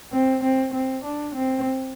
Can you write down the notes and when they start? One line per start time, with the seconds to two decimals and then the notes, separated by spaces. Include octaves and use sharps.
0.13 C4
0.43 C4
0.74 C4
1.05 D4
1.35 C4